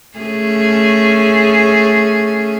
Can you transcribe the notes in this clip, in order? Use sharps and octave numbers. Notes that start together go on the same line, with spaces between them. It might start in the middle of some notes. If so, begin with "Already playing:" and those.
A3 C#4 G#4